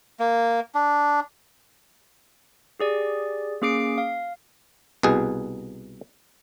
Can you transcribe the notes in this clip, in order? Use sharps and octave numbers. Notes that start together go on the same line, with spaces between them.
A#3
D4
G4 G#4 D5
A#3 C#4 G#4 D6 C7 D7
F5
C2 B2 G#4